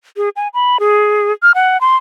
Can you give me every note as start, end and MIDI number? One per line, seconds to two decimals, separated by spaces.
0.17 0.29 68
0.36 0.48 80
0.54 0.77 83
0.80 1.32 68
1.43 1.52 89
1.55 1.80 78
1.81 1.96 84